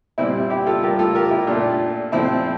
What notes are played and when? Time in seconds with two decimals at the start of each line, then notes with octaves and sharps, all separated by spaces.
0.18 A#2 G3 C4 E4
0.50 E4 G4
0.66 F4 A4
0.83 G3 G4 A#4
0.87 A2
0.99 F4 A4
1.15 G4 A#4
1.31 E4 G4
1.47 A#2 A3 D4 F4
2.12 A#2 F3 A3 C4 E4